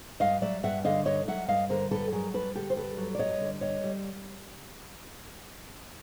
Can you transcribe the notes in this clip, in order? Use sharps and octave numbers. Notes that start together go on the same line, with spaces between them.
G2 D#5 F5
F#3 D5 E5
G2 E5 F#5
D3 D#5 F5
G2 C#5 D#5
F#3 E5 F#5
G2 D#5 F5
D3 A#4 C5
G2 A4 B4
F#3 G#4 A#4
G2 A4 B4
D3 G4 A4
C5
G2 A4 B4
F#3
D5
G2 C#5 D#5
D3
G2 C#5 D#5
G3